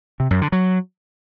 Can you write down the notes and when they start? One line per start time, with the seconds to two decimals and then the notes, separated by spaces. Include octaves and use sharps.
0.20 C3
0.31 F#2
0.41 D3
0.52 F#3